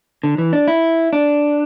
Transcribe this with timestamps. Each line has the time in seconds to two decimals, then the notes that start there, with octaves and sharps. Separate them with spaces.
0.24 D3
0.38 E3
0.53 D4
0.68 E4
1.13 D4